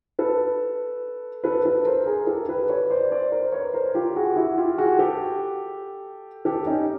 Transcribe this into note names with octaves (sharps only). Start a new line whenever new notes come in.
A4 B4
A4 B4
A4 B4
A#4 C5
G#4 A#4
G4 A4
A4 B4
B4 C#5
C5 D5
C5 D5
A#4 C5
B4 C#5
A#4 C5
F4 G4
F#4 G#4
E4 F#4
F4 G4
F#4 G#4
G4 A4
G4 A4
C#4 D#4